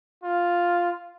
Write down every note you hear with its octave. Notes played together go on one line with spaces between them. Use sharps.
F4